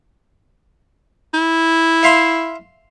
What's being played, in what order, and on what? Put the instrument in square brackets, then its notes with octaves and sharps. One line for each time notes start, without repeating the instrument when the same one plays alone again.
[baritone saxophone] E4
[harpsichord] E5 F5 C6